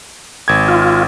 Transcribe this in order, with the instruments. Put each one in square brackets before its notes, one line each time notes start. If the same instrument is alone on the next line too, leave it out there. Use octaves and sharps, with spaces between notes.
[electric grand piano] G#1 G#6
[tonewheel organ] F4